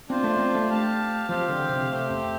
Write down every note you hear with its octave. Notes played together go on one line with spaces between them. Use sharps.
C4 D4 F4 C5
A3
C4
A3
G4 F5 A5
F3 C4 G4 F5
D3
C3
A3 C4 G4
F2